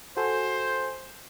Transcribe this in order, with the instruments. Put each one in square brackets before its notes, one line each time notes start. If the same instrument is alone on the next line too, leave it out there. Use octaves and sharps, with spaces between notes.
[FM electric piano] F#4 A4 G#5 [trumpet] C5